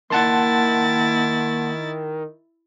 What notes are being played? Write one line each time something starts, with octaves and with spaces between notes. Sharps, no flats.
D#3 A#3 E4 F#5 A5 C6 A6